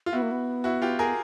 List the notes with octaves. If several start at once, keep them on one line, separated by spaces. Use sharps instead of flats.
F4
B3 E4 F#4
A#3
B3
E4 F#4
F4 G4
G#4 A#4